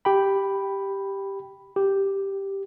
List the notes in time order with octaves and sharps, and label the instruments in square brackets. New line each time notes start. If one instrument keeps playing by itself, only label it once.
[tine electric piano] G4 G5 B5
G4